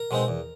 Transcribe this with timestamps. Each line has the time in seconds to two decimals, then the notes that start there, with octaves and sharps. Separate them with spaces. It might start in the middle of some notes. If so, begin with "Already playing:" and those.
Already playing: A#4
0.11 B2 G#3 C4 D#4
0.28 E2